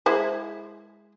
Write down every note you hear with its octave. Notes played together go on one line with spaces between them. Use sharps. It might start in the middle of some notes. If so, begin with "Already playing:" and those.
G#3 E4 C5